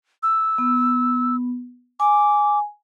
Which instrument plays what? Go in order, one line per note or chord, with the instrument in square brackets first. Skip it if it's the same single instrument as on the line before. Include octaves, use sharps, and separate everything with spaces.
[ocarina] E6
[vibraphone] B3
[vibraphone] G#5 [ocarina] D6